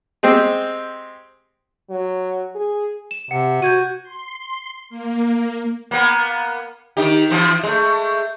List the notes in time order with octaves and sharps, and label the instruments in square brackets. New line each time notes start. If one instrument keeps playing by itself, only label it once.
[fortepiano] G#3 C4 G4
[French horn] F#3
G#4
[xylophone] E7
[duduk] C3 [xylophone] F#5
[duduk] F#4 [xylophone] G6 G#6 D#7
[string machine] C6
A#3
[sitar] A#3 B3
D#3 D#4 G4
E3 F3 C4
G#3 A3